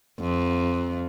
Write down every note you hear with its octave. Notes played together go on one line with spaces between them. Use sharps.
F2